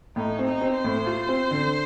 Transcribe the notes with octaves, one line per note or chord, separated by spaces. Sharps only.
A2 D#4
C4
D#4
C4
C5
A2
F4
C4
D3